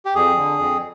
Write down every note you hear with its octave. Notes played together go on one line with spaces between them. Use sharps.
G4
F2 G#4
D3
F2